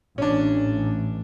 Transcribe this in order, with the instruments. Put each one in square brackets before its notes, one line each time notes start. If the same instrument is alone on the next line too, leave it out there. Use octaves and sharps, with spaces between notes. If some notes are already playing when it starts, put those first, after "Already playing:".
[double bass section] A1 [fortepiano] C#4 D4